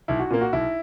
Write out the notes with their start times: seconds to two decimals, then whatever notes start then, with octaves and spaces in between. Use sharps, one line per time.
0.08 B1 E4
0.19 F#4
0.30 A#2 A#3
0.41 F#4
0.53 B1 E4